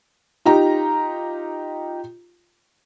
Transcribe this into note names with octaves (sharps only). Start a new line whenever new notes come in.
D#4 F4 G4 A#5